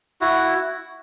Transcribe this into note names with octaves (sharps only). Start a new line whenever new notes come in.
E4 F#4